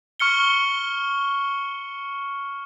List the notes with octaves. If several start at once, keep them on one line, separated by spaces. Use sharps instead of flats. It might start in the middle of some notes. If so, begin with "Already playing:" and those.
C#6 F6 C#7 G7